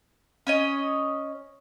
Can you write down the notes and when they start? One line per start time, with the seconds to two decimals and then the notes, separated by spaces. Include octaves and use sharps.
0.47 C#4 C#5 D#5